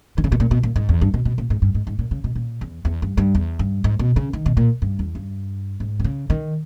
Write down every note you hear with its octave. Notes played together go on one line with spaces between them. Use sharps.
D#3
C#3
B2
A#2
B2
A#2
G#2
E2
G2
B2
B2
A#2
G#2
G2
G#2
G#2
A#2
C#3
B2
A#2
E2
E2
G2
G2
E2
G2
G#2
B2
C#3
D#3
B2
A#2
G2
E2
G2
G#2
D#3
C#3
D#3